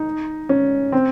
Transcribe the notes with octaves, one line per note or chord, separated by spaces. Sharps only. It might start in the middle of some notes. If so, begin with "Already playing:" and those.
Already playing: D#4
C#4
C4